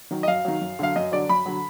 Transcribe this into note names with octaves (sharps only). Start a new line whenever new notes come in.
D#3 F#3
D#5
F#2 F5
D#3 F#3
F#2
D3 F#3 F5
F#2 D#5
D3 F#3 D5
F#2 B5
D3 F#3